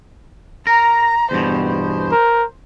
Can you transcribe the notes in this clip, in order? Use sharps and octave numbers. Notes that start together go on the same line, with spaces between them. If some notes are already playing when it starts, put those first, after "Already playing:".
A#4 A#5
E2 G2 B2 C5
C5
A#4